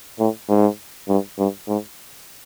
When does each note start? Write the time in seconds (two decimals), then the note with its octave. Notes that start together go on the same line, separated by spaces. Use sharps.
0.19 A2
0.49 G#2
1.09 G2
1.38 G2
1.68 G#2